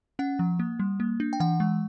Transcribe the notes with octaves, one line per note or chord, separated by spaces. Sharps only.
C#4 F#5
F3
A#3
G3
A#3
D4
G5
E3 F#5
G#3